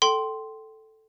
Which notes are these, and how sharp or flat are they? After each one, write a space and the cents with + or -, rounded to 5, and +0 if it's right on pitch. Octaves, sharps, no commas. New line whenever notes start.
A4 +0 G5 -25 C6 +0